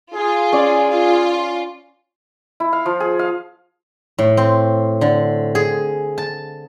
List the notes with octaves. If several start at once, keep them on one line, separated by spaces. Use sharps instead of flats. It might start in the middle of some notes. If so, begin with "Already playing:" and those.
F4 G#4
C#4 D5
F4
E4
F5
F3
G#4
F5
A2
C4
D3
G#4
A5